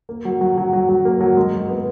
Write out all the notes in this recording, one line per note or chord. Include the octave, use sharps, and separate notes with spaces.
A#3
F#3
F#3
F#3
F#3
F#3
A#3
F#3
G#3
G#3
B3